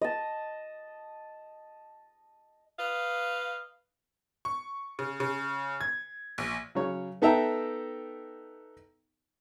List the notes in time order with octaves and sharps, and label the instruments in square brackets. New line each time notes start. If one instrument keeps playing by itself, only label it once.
[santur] D#5 A5
[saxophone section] B4 D#5 F5
[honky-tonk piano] C#6
C#3
C#3
G#6
A#1
[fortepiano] C#3 F#3 C#5
B3 D#4 A4 E5 G5 A#5